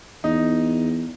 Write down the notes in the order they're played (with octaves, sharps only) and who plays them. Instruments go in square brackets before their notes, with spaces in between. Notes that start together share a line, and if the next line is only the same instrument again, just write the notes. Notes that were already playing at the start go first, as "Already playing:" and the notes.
[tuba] E2 [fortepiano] D#4